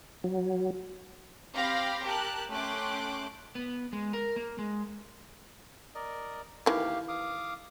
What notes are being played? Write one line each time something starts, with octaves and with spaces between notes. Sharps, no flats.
F#3
C4 G4 F5 B5 C6 A#6
G4 A#4 A5 F#6
A3 C#4 G5 C6 D6 F#6
B3
G#3
A#4
A#3
G#3
A#4 D5 D#5
D#3 E3 A#3 G4 F5
F5 D6 D#6